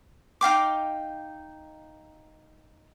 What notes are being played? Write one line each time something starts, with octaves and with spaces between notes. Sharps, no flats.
D#4 F5 G5 D6